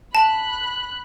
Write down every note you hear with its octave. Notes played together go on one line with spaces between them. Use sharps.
A5 B5 F#6